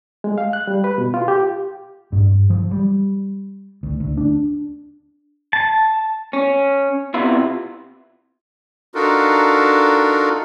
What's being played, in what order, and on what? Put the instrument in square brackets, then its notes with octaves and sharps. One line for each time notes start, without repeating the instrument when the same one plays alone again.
[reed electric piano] G#3
F5
F#6
G3
B4
B2
F4
G4
[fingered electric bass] G2
F3
G3
D2
D2
D4
[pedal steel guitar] A5
[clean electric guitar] C#4
C3 B3 E4 F4
[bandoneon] D4 D#4 F4 F#4 A4 A#4